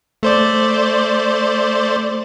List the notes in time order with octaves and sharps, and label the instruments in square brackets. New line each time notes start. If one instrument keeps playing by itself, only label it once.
[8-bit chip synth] A3 C5 D5